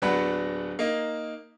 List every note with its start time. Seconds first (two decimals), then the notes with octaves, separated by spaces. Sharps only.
0.02 D1 F#3 B3 D4 F#5 B5
0.79 A#3 D#4